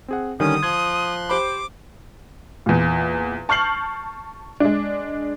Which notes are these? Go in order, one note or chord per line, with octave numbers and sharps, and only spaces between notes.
C4 G#4 F#5
D3 D#3 G3 C#4 D#6
F3 C6 F#6 G#6
G4 C5 B5 D6
E2 A#2
A5 C#6 F6 G6 C7 F#7
G#3 D4